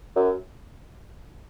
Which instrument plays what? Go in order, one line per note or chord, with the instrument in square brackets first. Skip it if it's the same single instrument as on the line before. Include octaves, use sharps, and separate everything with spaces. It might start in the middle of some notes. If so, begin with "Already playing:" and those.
[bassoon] F#2